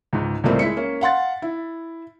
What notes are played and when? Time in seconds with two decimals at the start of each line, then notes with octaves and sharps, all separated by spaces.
0.13 C#2 G#2
0.44 C#2 A2 G3 A3 A#3 C4
0.59 G#3 E4 B6 C#7
0.77 A#3 C#4
1.01 F5 F#5 C6 A6
1.42 E4